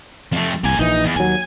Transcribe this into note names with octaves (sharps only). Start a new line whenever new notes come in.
F2 A3
C2 A#3 G#5
A#1 E3 D#4
E2
D#2 F#3 G#5